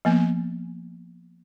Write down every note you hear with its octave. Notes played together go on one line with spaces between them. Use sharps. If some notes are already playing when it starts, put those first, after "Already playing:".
F3 A#3 B3